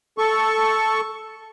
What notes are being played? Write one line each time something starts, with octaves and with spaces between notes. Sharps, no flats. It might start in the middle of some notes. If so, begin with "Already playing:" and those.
A4 C#6